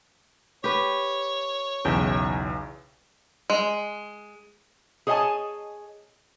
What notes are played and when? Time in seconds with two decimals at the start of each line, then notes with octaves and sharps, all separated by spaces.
0.64 G4 B4 C#5
1.85 B1 E2 C#3 E5 G5
3.50 G#3
5.07 G#4 C#5 D#5 E5 G#5 A5